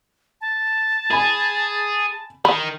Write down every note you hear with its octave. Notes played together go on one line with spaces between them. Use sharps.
A5
G#4 G#5 B5
D#3 B5